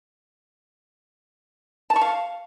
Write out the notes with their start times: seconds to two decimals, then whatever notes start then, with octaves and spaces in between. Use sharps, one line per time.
1.90 A5
1.96 C#6
2.01 F5